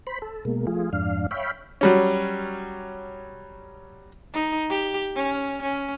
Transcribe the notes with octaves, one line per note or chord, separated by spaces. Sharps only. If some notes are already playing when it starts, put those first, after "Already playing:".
C5 B5
A4
B2 G#3 A#3
F3 A3 F4 G#4
F2 G#2 D4 F5
C#5 E5 F5 G5 B5
F#3 G3 C#4
D#4
G4
C#4
C#4